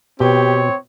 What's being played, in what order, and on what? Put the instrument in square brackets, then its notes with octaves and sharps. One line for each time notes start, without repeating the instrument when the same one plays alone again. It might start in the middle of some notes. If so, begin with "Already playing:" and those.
[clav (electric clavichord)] B2 [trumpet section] C4 C#5 [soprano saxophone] G4